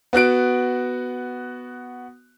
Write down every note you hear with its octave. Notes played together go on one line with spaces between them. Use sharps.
B3 F#4 F#6 D7